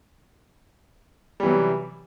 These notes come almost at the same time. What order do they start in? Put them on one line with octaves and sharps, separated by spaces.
G3 E3 F#3 C3